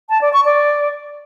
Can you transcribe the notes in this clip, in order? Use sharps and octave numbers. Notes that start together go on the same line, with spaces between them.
A5
D5
C#6
D5